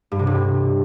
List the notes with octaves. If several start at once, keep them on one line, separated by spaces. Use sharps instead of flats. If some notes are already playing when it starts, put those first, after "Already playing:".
G2
C3
G2